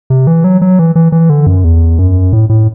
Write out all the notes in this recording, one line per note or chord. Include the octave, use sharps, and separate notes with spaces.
C3
E3
F#3
F#3
E3
E3
E3
D3
F#2
E2
F#2
A2
A2